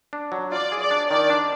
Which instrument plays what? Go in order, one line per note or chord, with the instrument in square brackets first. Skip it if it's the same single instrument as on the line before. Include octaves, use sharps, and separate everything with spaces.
[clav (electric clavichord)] D4
F#3
[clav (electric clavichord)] F4 [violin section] D5
[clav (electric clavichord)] G#4
[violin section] D5
[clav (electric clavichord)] D4
[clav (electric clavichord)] D#3 [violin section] D5
[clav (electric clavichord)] D4